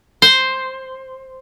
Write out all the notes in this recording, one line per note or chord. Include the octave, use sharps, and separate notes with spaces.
C5